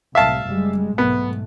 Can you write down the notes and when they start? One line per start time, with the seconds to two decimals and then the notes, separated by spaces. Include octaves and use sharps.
0.15 C2 A2 C3 E5 F5 A5
0.48 F#1 G3 G#3
0.98 B1 G#2 A3 B3